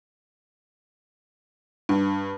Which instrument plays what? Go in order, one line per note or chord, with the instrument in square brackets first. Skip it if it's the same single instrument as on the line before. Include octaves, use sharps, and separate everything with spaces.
[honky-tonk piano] G2